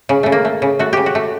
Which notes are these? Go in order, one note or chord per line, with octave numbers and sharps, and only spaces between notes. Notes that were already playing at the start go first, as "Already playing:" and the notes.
C#3
C#3 A3
A#3
A3
C#3
A3 F#4
C#3 G4
F#4
A3